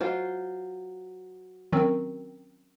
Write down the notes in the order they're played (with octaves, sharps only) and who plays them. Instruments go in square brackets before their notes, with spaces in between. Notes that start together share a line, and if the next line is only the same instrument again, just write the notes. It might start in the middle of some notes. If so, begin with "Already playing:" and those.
[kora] F#3 F4 C5
[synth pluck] D#3 F#3 C4 [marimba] C#4 A#4